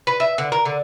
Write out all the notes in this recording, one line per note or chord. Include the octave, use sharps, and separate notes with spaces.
B4
E5
D3
A#4
D3